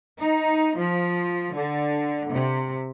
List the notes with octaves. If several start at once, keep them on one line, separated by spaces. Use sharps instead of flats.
D#4
F3
D3
C3